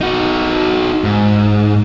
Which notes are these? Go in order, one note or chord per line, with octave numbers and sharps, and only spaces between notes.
D#4 F#4
G#2